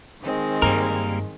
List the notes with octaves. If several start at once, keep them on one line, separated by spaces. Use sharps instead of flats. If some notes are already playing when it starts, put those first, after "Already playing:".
D#3 G#3 C4
G2 G3 A#3 A#4